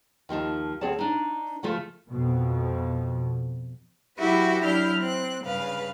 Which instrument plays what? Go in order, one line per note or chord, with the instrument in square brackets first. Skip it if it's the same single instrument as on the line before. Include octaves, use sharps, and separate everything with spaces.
[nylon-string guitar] D#2 F3 D#4 A5
D2 C4 G#4 C#5 A5
D4 D#4
C#3 F3 A3 F4
[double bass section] F2 B2
[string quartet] F#3 E4 F#4 G4 B4 E5
F#3 D4 E4 F6 G6
C4 F#6
G2 C#3 B4 F5